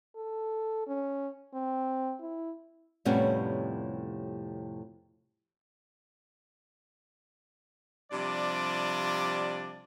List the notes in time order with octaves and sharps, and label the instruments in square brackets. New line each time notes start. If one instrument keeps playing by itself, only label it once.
[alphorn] A4
C#4
C4
E4
[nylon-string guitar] F2 A2 C3 G3 B3 C#4
[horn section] C3 F3 G3 D4 D5